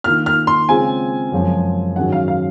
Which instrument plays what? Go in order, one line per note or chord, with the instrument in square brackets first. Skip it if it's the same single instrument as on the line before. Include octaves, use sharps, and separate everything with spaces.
[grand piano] D#3 A#3 F4 [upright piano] F6
[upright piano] F6
C6
[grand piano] C#3 G#3 C4 F4 [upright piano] G#5
[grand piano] F#2 C#3 F3 G#3
[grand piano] G#2 D#3 F#3 C#4 F#4 [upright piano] F#5
[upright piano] F5
F5